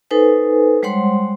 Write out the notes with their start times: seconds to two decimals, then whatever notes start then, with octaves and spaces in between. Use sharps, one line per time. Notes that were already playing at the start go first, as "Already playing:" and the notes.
0.11 D#4 A4 B4 C5 G#5
0.83 G3 G#3 C5 C#5 F#5 C6